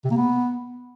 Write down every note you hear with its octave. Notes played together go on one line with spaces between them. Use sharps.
C3
A#3
B3